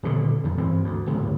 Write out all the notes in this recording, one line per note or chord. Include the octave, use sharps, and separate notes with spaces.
D#1 B2 D3
F2 D#3
G2 E3 C4
D2
D1 G1 C#2 A2